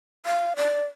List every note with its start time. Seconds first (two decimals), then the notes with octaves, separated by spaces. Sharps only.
0.26 F5
0.57 D5